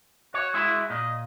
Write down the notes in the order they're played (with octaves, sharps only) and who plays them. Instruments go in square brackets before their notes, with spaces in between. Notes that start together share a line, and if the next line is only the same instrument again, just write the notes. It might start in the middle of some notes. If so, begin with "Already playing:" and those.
[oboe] F#4 [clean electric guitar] C#5
[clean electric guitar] G#3 E4
[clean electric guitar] A#2 [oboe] D#5